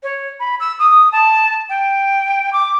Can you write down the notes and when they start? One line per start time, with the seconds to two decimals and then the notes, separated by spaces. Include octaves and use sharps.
0.03 C#5
0.39 B5
0.60 E6
0.79 D#6
1.12 A5
1.69 G5
2.52 D6